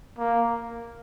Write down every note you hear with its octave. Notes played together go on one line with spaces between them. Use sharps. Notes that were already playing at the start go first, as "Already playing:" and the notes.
A#3